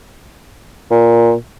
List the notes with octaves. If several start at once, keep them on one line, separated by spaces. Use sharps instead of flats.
A#2